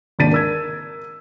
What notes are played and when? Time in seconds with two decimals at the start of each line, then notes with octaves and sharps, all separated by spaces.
0.19 G#1 D#2 D4 A6 B6 D#7
0.32 A#4 E6 G#6